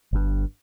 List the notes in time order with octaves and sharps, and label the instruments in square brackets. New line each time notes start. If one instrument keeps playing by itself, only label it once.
[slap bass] G1 G2